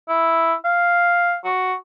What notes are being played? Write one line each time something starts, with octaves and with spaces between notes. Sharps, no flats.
E4
F5
F#4